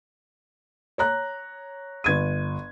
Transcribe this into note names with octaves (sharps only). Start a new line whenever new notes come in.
C#5 A#5 F#6
G1 G#6 D#7